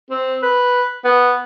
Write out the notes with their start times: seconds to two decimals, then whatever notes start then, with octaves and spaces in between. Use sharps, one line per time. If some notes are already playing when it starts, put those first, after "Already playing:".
0.11 C4
0.43 B4
1.05 B3